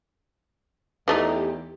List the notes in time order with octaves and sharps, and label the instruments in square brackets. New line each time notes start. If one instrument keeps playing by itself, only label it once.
[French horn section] E2 G4 [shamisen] E3 A3 D#4